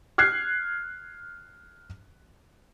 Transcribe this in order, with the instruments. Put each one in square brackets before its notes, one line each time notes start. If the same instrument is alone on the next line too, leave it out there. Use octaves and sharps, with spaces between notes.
[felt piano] F6 F#6 G#6 C7